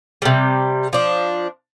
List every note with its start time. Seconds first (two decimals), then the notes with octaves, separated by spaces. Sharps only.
0.22 C3 G3
0.93 F3 D4